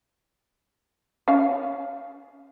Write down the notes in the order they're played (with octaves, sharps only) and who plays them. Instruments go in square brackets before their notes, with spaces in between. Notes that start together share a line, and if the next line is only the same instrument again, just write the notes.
[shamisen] C#4 F5